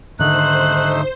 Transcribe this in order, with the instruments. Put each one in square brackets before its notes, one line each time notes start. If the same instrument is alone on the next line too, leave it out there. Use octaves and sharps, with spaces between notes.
[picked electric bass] G#2 D3 D#3 [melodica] A3 D#4 [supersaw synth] C5 [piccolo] F#6